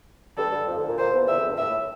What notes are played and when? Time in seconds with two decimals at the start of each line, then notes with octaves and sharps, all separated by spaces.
0.37 G2 G3 A4
0.52 G2 G3
0.68 F2 F3
0.77 D2 D3
0.88 A#2
0.98 A#2 C5
1.13 E2
1.27 E2 E5
1.38 F2
1.48 G2
1.58 A2 E5
1.69 A2